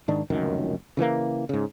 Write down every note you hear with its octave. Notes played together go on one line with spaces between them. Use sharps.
G#2 D#3 D4
F1 C#2 F#2 D#3
C#3 E3 F#3 A#3
G#2 C#3